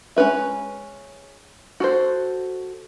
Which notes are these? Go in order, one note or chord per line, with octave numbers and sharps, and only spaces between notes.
G#3 C#4 G#4 B4 E5
F#4 A4 C5